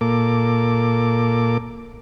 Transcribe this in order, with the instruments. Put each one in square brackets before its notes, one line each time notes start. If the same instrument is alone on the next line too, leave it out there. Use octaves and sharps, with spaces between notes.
[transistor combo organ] A#2 A#3 A4 D6